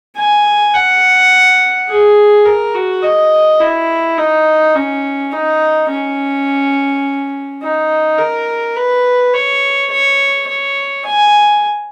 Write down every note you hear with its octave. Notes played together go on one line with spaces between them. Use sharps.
G#5
F#5
G#4
A#4
F#4
D#5
E4
D#4
C#4
D#4
C#4
D#4
A#4
B4
C#5
C#5
C#5
G#5